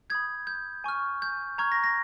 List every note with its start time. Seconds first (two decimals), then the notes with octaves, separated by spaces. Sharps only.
0.10 B5 D#6 G6 G#6
0.47 G6
0.84 G#5 C#6 F6
1.22 G6
1.58 A#5 C#6 F6 G#6
1.72 A#6
1.84 A#6